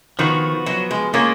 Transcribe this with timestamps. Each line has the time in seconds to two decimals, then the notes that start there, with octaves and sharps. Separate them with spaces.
0.19 D#3 F3 B3 F#4
0.66 F#3
0.91 G#3
1.14 G#3 A#3 C#4 F4 G#4